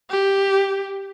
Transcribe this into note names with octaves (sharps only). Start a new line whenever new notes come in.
G4